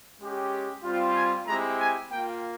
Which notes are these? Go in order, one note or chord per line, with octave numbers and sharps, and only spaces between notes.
G#3 C#4 G4
G3 C4 F4
G#5
G#3 C4 E4 G4 A#5
G#5
A#3 F4 G5